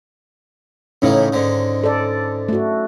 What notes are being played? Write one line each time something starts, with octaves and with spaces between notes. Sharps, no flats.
A2 C#3 E3 C#4 D#4
G#2 D3
A4 D5
A3 F#4